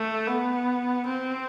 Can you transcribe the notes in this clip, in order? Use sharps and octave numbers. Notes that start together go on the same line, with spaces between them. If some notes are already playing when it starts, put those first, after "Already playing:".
Already playing: A3
B3
C4